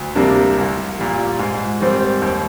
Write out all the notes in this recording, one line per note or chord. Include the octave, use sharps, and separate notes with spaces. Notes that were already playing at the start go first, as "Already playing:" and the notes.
Already playing: D2
C3 G3 A#3 D4
C2
A#2 G3
G#2
D#3 G3 C4
D#2